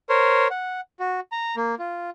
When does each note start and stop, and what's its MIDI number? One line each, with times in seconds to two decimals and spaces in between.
0.09 0.48 70
0.09 0.48 72
0.09 0.48 73
0.51 0.81 78
1.00 1.20 66
1.32 1.56 82
1.57 1.75 58
1.79 2.10 65